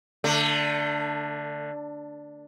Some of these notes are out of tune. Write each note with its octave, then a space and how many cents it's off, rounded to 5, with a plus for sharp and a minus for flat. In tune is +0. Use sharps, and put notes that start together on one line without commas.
D3 +0 A3 +30